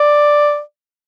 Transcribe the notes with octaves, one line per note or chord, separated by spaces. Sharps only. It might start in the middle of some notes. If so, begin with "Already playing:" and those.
Already playing: D5